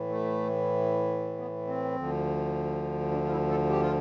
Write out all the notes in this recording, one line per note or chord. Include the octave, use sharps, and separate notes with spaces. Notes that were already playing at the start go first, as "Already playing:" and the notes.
Already playing: A2 E3
A3
B3
C4
D2 D3 F3
D4
F4
E4
A4
G4
F4